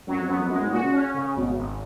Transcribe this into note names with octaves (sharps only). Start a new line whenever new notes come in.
F#2 F#3
F2
F#2 B3
F2
F#2 G#3
G#2
A#2 F#4
C#3
C#4
C#3
G#1 B2
G#1